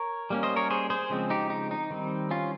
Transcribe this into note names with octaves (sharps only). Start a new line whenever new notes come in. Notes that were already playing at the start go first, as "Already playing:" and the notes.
Already playing: A#4 C#5
G3 A#3 C#4
C5 D#5
A#4 C#5
G#4 C5
G#4 C5
C#3 F3 G#3 C4
D#4 G4
D#4
D#4
D#3 G3 C4
C#4 F4